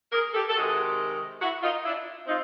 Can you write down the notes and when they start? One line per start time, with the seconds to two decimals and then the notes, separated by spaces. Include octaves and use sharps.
0.12 G#4 A#4
0.34 G4 A4
0.49 A4
0.56 C3 D#3 G#3 F#4 G#4
1.42 E4 F#4
1.63 D#4 F4
1.85 D4 E4
2.27 C4 D#4 F4